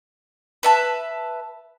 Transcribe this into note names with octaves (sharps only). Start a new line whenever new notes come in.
B4 E5 A5